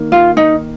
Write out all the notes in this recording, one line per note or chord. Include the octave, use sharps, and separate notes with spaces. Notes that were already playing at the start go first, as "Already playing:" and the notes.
Already playing: D#3 A#3
F4
D#4